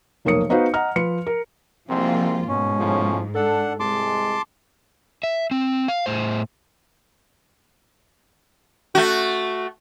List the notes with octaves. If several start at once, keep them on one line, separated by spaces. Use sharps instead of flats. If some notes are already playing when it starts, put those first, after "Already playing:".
F1 B1 A#3 C#5 D#6 C#7
B3 D#4 F#4 B4 C5 F5
D#5 F#5 A#5 F6
F3 B4 C#7
A#4
C2 G#2 F3 A#3 C4 F4
G#2 B2 C#4
A2 C#3 F3
D4 A4 F#5
C2 G#3 A5 C6 D6
E5
C4
F5
A2 C5
A3 F#4